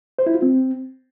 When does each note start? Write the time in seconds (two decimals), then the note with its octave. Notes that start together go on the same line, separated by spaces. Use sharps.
0.19 C5
0.26 E4
0.34 F4
0.42 C4